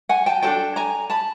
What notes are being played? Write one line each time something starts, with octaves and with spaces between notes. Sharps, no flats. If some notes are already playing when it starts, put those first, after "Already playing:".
F#5 G#5
G5 A5
D4 F#4 A4 G5 A5
G#5 A#5
A5 B5